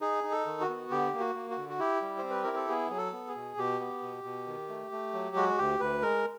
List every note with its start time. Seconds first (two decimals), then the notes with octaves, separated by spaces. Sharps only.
0.01 D#4 G#4
0.24 D#4
0.32 A4
0.46 D#3
0.61 F#4
0.69 B3
0.91 D3 G4
1.13 A#3
1.20 F#4
1.35 A#3
1.51 F#4
1.57 D3
1.69 F#4
1.79 E4 G4
2.02 G3
2.18 C5
2.24 C4
2.30 B4
2.43 E4 A#4
2.56 A4
2.69 B3 G#4
2.90 F#3 G#4
2.98 A4
3.13 B3
3.28 G#4
3.35 B2
3.57 B2 G4
3.80 B3
4.02 B2
4.24 B2
4.47 D#3
4.69 A3
4.92 A3
5.13 F#3
5.36 G#3 F#4
5.58 D2 G4
5.80 D2 B4
6.02 G#3 A#4